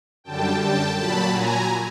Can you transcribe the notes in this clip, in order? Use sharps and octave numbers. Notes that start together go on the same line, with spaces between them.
F#2 D3 G3 G5 A5
G5 A5
A#2 F#3 A5 B5
G#5 A#5